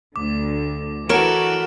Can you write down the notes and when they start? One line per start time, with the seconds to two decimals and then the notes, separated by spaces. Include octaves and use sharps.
0.16 D2 D3 D6
1.09 E3 F#4 A4 A#4 C#5 F6 D7 E7